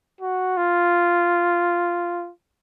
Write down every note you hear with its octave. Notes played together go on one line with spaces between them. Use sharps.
F#4
F4